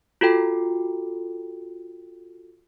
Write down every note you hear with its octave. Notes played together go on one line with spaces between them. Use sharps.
F4 F#4 A4 G5